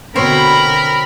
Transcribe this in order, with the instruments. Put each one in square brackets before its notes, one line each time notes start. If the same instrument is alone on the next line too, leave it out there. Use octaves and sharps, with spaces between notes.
[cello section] B2 D3 [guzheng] C4 C#5 [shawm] A#4 [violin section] B5